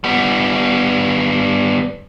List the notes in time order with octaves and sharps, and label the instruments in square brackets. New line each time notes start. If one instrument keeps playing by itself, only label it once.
[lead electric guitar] G3 B3